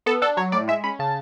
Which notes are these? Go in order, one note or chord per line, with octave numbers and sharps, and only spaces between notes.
B3 A4
D4 A4
F#3 C#5
A2 D5
G#3 E5
C#4 B5
C#3 A5